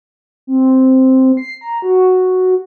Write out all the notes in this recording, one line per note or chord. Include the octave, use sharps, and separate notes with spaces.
C4
C7
A#5
F#4